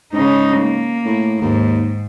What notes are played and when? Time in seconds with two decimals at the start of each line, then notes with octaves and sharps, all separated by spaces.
0.13 G#2 C#3 D#4
0.58 A#3
1.05 A2
1.41 D#2 G#2